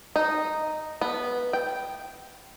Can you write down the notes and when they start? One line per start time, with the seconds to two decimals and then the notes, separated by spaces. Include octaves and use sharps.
0.16 D#4
1.01 B3
1.53 G5